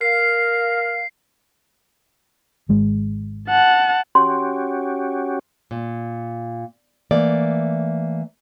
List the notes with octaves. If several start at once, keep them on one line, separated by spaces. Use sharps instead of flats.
A#4 F5 C7
G#1 G#3
F#5 A5
C#4 F#4 G4 C6
A#2
E3 A3 A#3 D5